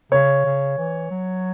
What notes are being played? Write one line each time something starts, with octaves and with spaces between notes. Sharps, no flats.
C#3 C#5
C#3
E3
F#3